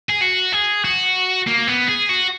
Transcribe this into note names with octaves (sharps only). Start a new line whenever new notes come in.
G#4
F#4
G#4
F#4
A#3
B3
G#4
F#4